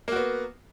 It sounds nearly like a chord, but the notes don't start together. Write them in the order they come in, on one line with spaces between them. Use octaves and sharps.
A#3 F#4 B3